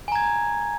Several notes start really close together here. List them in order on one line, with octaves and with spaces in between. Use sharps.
G#5 A#5 G#6